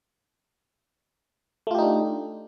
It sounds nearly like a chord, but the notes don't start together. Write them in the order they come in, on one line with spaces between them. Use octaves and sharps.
A3 F4 G4 D#4 D4